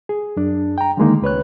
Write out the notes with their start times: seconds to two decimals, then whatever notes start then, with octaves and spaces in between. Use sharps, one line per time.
0.09 G#4
0.37 F#2 D4
0.78 G5 A#5
0.97 D3 D#3 G#3 A#3 D#4
1.22 C#2 B4 C#5 F#6